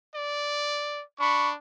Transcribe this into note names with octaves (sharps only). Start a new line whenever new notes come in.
D5
D4 B5 C#6